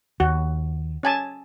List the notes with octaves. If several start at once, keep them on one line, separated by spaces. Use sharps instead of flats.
D#2 F#4
C#4 G#5 A5